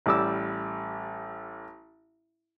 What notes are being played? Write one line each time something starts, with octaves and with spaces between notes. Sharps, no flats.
A1 G3 D6 E6